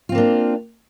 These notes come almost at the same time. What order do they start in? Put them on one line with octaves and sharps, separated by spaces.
F4 C4 A#3 D4